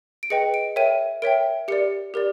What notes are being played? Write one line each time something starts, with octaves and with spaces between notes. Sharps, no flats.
D7
G#4 B4 D#5 G5 C#7
D7
A#4 C#5 E5 G5 D#7
A#4 C#5 E5 G5 D7
G4 A#4 D5 C#7
G4 A#4 D5